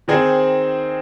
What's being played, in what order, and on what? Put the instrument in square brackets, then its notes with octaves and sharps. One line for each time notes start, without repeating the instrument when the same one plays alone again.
[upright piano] D#3 C4 D#4 G#4 C5